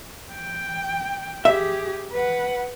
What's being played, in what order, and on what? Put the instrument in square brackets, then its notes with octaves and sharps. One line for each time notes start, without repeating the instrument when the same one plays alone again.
[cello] G5
[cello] G4 G#4 [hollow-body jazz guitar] E5
[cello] B4 F#5